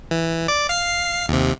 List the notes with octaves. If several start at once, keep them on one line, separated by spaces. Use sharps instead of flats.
E3
D5 D6
F5 C7
D#2 C3